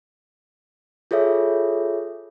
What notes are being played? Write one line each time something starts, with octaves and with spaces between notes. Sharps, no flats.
F4 G#4 A4 C#5 E5